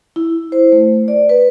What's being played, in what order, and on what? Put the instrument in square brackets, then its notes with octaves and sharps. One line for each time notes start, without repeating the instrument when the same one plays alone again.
[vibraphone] E4
C5
A3
D5
B4